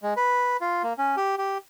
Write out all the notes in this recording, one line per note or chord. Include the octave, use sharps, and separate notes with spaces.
G#3
B4
F4
A#3
C#4
G4
G4